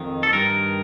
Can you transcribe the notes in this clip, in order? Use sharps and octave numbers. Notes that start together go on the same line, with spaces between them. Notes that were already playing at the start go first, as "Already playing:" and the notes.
Already playing: F2 D#3
A4
G2 D#3 A#4